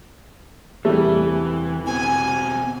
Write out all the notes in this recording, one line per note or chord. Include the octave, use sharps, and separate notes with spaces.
E2 C3 E3 G3 A3
B2 C4 G#5